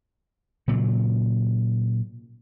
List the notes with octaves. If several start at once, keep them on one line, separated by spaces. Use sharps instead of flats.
A#2 C#3 F#3